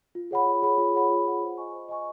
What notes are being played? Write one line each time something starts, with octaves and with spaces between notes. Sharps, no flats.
F4
G#4 C#5 F#5 B5
F4
G#4 C#5 F#5 B5
F4
G#4 C#5 F#5 B5
F4
G#4 C#5 F#5 B5
C5
D#5 G#5 C#6
C5
D#5 G#5 C#6